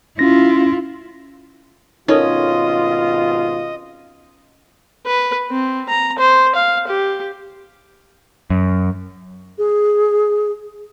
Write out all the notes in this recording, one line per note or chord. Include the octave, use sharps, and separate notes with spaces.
C#4 E4 F4 A#6
G#1 B2 C#4 D#4 F4 A4 A#4 D#5
B4
C4
A#5
C5
F5
G4
F#2
G#4